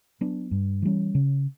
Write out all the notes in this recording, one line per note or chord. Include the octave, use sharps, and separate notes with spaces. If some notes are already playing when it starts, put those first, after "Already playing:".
F#3 B3 D4
G2
E3 G3 C#4
C#3